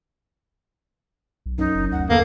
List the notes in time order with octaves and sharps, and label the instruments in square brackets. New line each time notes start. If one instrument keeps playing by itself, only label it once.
[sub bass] B1
[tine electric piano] F#2 [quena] D#4
[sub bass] F#1
[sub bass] D2 [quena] F#5
[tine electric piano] G1 B3 A4 [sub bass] E2 [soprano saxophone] A#3 [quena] F5